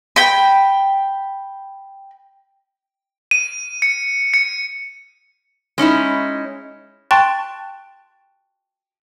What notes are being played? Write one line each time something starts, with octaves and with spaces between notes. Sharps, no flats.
G5 B5
D#7
C#7
C#7
G#3 C#4 D#4 E4
G5 A5 C6 C#6 F#6 A6